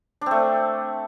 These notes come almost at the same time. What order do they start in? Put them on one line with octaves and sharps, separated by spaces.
D4 C4 A3